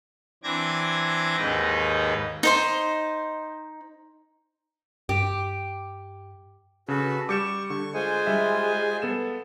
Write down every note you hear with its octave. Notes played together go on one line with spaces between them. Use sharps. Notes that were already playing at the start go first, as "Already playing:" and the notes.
E3 C4 D4 D6 G#6 A#6
D#2 G#2 D#3 D#4 B4
D#4 C5 C6
G2 G4
C#3 F#4 A4 B4
G3 C#6 D6 C#7 E7
D3 C#6
G#3 F4 C5 G#5
G3 E5
B3 A4 E7